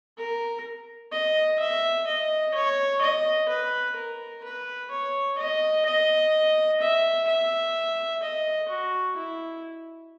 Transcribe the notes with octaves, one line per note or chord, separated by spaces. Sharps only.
A#4
D#5
E5
D#5
C#5
D#5
B4
A#4
B4
C#5
D#5
D#5
E5
E5
D#5
F#4
E4